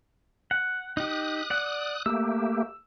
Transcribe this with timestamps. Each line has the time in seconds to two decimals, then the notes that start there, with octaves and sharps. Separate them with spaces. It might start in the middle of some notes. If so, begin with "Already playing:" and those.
0.51 F#5
0.97 D#4 G4 D#6 F#6
1.50 D5 F#5
2.06 A3 A#3 G4 E6